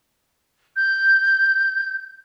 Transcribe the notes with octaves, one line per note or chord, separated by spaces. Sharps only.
G6